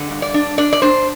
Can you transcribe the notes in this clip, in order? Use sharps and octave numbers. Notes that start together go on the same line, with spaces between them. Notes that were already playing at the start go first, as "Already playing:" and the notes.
Already playing: D3
G2
D5
D4
D4 D5
D5
D4 C5